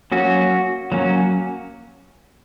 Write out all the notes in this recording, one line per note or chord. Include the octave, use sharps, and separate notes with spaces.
F#3 A#3 C#4 F#4
F#3 A#3 C#4